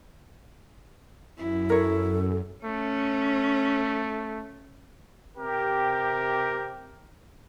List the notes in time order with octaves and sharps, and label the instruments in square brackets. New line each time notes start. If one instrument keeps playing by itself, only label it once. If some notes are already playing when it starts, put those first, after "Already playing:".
[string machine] F#2 [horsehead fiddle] E4
[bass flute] A4 [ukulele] A#4 C#5
[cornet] A3 [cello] C#4
[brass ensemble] C3 G4 [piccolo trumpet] A#4